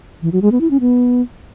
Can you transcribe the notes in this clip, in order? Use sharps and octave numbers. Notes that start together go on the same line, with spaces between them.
E3
F#3
G#3
B3
E4
C#4
B3